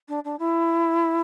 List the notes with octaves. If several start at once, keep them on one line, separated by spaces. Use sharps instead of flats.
D4
D4
E4